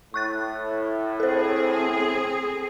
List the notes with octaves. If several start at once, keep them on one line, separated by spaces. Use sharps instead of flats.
A2 C#6 F#6 A6
C4 G#4 A4 C5